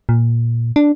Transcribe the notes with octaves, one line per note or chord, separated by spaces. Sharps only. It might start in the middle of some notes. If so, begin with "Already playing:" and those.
A#2
D4